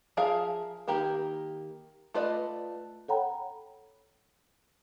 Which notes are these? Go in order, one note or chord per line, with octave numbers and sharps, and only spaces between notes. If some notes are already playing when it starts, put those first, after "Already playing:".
F3 G#4 A#4 E5 F5
D#3 A#3 G4 A#4 B5
A3 F4 B4 D5 D#5
A4 C#5 F#5 G5 A#5 B5